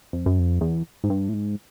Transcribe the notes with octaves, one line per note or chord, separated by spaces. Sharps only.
F2
F#2
F2
E2
G#2
G2
A2
G#2